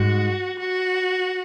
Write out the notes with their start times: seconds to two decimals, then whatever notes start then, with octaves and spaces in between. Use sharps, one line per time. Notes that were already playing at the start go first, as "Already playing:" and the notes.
Already playing: G#2 F#4
0.59 F#4